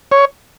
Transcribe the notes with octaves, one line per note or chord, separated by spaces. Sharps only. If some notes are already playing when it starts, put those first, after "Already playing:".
C#5